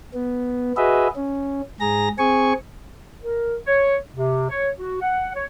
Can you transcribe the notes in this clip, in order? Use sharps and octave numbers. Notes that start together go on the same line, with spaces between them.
B3
F#4 G#4 B4 D#5 E5
C#4
G#2 G#4 A#5 A#6
C4 G#4 G#5 C#6
A#4
C#5
C3
C#5
F#4
F#5
C#5